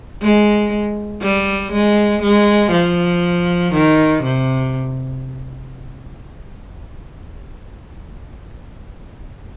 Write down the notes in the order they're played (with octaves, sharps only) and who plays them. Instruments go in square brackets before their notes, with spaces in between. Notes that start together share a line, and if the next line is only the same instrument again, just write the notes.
[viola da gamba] G#3
G3
G#3
G#3
F3
D#3
C3